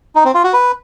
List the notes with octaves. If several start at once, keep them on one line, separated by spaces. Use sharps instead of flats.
D#4
C4
F4
F#4
B4